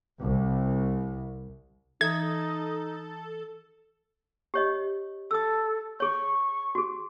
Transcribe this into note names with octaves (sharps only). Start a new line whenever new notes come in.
C2
E3 D#4 A4 G#6
G4 C#5 D#5
A4 D#6 E6
G#4 C#5 C#6
F#4 G#4